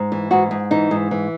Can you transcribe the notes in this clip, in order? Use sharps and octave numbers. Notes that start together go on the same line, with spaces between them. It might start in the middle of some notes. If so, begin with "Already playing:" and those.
Already playing: G#2
E3
G#2 F#4
G#2
E3 D#4
G#2
E3